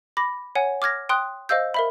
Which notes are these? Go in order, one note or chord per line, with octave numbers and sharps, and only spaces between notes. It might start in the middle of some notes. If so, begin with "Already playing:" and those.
B5 D6 A#6
C#5 F#5 G#5
D6 F6 G#6 A#6
G5 C6 D#6 F#6
C5 D#5 F5 E6 G6
A#4 E5 B5